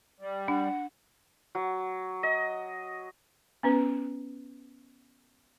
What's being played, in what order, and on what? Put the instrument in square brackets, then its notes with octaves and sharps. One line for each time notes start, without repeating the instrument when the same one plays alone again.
[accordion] G3
[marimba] D4 [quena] F#5
[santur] F#3
D#5
[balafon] B3 C#4 B4